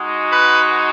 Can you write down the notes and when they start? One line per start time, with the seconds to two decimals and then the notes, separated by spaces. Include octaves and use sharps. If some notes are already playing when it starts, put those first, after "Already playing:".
Already playing: G#3 D#4 F#4
0.30 B4